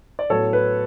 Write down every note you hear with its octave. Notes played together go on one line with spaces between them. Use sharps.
D5
A2 F#3 B3 A4 C#5
B4